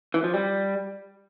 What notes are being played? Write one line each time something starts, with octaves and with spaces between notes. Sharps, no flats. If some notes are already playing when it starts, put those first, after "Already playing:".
E3
F3
G3